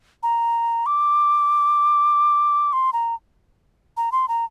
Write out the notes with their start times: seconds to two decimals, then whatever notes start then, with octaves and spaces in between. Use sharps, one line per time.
0.23 A#5
0.86 D6
2.73 C6
2.93 A#5
3.97 A#5
4.12 C6
4.28 A#5